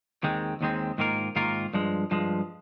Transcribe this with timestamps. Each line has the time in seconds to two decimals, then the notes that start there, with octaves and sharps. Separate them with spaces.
0.23 D#2 D#3 G#3 C4
0.61 D#2 D#3 G#3 C4
0.98 G#2 D#3 A#3 F4 A#4
1.36 G#2 D#3 A#3 F4 A#4
1.74 G2 F3 G#3
2.11 G2 F3 G#3